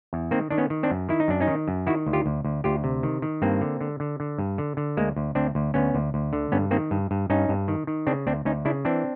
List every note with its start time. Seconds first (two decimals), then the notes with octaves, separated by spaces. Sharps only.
0.13 E2
0.31 D#3 A#3 C4
0.50 D#3 D4
0.58 B3 C#4
0.70 D#3
0.83 C4 D4
0.91 F#2
1.09 D#3 E4
1.20 D#4
1.28 F#2 D4
1.40 C#4 D#4
1.47 D#3
1.68 F#2
1.87 D#3 E4 F#4
2.07 D2
2.13 F4 G4
2.26 D2
2.45 D2
2.64 D2 F4 G4
2.84 C3
3.03 D#3
3.22 D#3
3.42 G2 A#3 C4
3.61 D3
3.81 D3
4.00 D3
4.20 D3
4.38 G2
4.58 D3
4.77 D3
4.97 D2 G#3 A#3
5.16 D2
5.35 D2 C4 D4
5.55 D2
5.74 D2 B3 C#4
5.95 D2
6.14 D2
6.33 D3
6.52 G2 B3 C#4
6.71 D#3 A#3 C4
6.91 G2
7.11 G2
7.30 G2 C#4 D#4
7.49 G2
7.68 D#3
7.87 D#3
8.07 C#3 C4 D4
8.27 D2 C4 D4
8.45 D2 C#4 D#4
8.65 C#3 D4 E4
8.85 E3 C4 D4